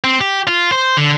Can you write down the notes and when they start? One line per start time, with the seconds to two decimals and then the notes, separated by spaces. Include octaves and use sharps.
0.04 C4
0.21 G4
0.47 F4
0.72 C5
0.97 D3